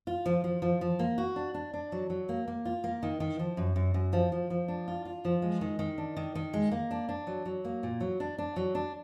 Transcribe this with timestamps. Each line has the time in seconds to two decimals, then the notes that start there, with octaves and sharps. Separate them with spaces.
0.07 F4
0.26 F3
0.44 F3
0.62 F3
0.81 F3
0.99 A#3
1.18 F#4
1.36 D4
1.54 D4
1.74 D4
1.92 F#3
2.10 F#3
2.29 A#3
2.48 A#3
2.65 F4
2.84 A#3
3.03 D#3
3.20 D#3
3.39 F3
3.57 F#2
3.76 F#2
3.94 F#2
4.13 F3
4.32 F3
4.50 F3
4.68 D4
4.88 F4
5.05 F4
5.25 F3
5.42 G#3
5.61 D#3
5.79 D#3
5.98 D4
6.17 D#3
6.35 D#3
6.54 G#3
6.72 A#3
6.91 D4
7.09 D4
7.27 F#3
7.45 F#3
7.65 A#3
7.83 A#2
8.01 F#3
8.20 D4
8.38 D4
8.56 F#3
8.75 D4